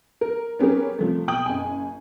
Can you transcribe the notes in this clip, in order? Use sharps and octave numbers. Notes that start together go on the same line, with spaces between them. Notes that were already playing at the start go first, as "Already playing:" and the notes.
A#4
B3 C#4 G4 G#4 A#4
C3 F3 A3
B2 G5 D#6 F#7
F#1 G#5